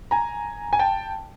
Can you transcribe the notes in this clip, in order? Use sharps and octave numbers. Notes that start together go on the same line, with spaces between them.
G#5 A#5
G#5
G5 A5